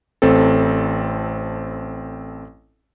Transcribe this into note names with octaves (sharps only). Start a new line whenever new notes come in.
A1 C4 A4